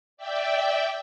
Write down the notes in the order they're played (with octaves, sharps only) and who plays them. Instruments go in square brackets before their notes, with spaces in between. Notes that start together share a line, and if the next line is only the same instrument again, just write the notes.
[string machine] D5 E5 G5